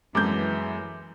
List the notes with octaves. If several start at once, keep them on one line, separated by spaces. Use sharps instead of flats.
F#2 E3 G#3 B3 A4 D6 G6